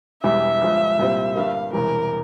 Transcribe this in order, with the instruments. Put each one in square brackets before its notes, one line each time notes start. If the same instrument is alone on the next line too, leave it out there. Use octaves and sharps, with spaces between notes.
[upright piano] E1 E2 E3 G3 [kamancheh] E5
[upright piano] G1 G2 F3 G#3
C2 A#2 G3 C4
[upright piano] G1 G2 G3 A#3 [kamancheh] F5
[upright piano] E1 E2 C3 E3 G3 [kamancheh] A#4